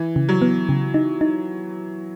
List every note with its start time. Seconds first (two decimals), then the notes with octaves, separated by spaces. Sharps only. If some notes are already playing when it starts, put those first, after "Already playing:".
Already playing: E3
0.16 C#3
0.29 F#3
0.42 B3
0.69 C#3
0.94 D#4
1.21 D#4